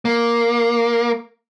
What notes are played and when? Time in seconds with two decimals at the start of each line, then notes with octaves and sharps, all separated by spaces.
0.05 A#3